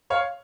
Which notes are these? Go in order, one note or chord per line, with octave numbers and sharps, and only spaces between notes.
C#5 F5